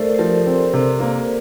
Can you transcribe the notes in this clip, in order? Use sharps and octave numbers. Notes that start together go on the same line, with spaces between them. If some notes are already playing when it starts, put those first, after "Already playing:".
Already playing: A3 A4 A#4 C5 D5
C5
F3 G4 A#4
C4
C3
A#3